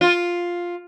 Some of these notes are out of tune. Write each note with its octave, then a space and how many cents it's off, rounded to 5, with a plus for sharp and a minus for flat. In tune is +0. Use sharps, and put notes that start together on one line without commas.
F4 +5